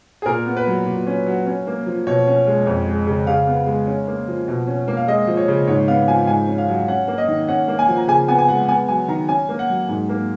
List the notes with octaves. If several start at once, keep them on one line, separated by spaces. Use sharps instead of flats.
G#4
A#2 A#4
B3
B4
F#3
A#2
C#4
F#3
C#4
A#3
F3
B2 C#5
C#4
G#3
F2
G#3
C#3
C#3 F5
B3
G#3
C#4
A#3
F3
B2
C#4
A#3
F5
G#3 D#5
F3
C#5
C#3
G#2 C#5
B3 F5
F3 G#5
G#2 G#5
C#4
F5
F#3
C#4 F#5
A#3
D#5
D#3
C#4 F#5
A#3
G#5
F3
A#5
C#3 G#5
B3 G#5
G#5
G#3 F#5
B3 G#5
F#3 G#5
D#3 A#5
C#4 G#5
A#3
F#5
F#3
G#2
A#3